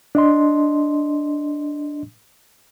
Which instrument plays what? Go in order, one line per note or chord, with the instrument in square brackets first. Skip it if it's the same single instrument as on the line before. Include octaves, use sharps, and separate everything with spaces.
[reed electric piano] D4 D#5 C6